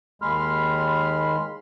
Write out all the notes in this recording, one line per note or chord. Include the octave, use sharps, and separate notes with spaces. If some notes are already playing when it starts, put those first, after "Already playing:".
D#2 G#3 B5 C6 F6